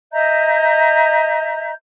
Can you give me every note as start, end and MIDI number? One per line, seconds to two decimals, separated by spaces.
0.12 1.72 75
0.12 1.72 76
0.12 1.72 82
0.12 1.72 91